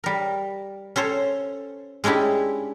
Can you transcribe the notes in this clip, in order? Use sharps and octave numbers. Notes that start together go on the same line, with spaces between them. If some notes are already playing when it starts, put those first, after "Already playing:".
G3 A#4
C#4 A4 C5 C#5
G#3 C#4 D4 E4 G4